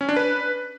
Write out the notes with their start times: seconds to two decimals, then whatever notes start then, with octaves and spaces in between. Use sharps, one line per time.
0.01 C#4
0.09 D4
0.16 B4